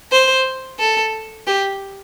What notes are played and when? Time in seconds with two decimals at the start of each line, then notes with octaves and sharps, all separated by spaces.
0.12 C5
0.79 A4
1.47 G4